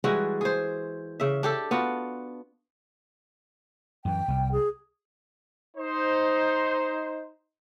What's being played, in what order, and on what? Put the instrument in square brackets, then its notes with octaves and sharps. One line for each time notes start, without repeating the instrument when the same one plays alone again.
[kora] E3 G3 G#3 F#4
G#4 C5
C#3 E5
D4 G4 A4
B3 F4 F#4
[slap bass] F#2 E3 [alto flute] G5
[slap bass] C2 G3
[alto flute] G#4
[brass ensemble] D#4 C5